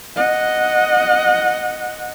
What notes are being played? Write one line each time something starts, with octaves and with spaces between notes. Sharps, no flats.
D#5 F#5